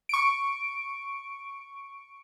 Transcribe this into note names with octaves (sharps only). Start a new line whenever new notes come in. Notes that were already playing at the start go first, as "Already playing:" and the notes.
C#6 D7